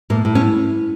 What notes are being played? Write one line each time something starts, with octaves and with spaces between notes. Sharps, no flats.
A2 A#3
A2
C#4